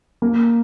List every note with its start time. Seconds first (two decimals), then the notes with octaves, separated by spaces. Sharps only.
0.22 A#3